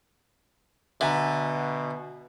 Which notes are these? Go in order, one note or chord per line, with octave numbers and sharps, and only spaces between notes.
B2 D3 E5 G#5 A#5